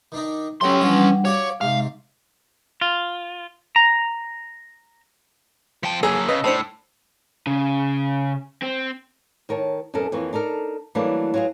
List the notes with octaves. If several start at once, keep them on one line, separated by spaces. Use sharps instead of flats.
D#3 D4 D#4
F#3 A3 C#4 G4 C#5 G5 C6
E3 F3 G3 D4 C#5 F#5
F#4 G4 C#5 D5 F5
G#2 C3 G#3 F5
F4
A#5
F3 G5 A5 C#7
F#3 A#3 G#4 E6
C#3 B4 D#5
A2 D4 C5 A5 B5 E6 C#7
C#3
C4
D#3 A#4 C#5 A5
F#2 B2 C#4 A4 A#4
F2 E3 A#3 C#5
D4 D#4 A4 A#4
E3 F#3 G3 A3 A#3 D4
F#3 F4 G#4